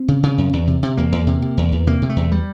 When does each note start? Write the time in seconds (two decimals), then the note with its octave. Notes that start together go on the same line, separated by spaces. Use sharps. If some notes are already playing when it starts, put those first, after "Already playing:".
Already playing: C4
0.08 C#3
0.23 C#3
0.38 F#2
0.53 E2
0.67 C3
0.83 C3
0.97 E2 A#3
1.12 E2
1.27 C3
1.42 C3
1.57 E2
1.72 E2
1.87 C3 A#3
2.02 C3
2.10 A3
2.16 E2
2.32 G3